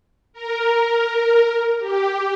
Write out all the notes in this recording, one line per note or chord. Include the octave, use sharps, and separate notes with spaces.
A#4
G4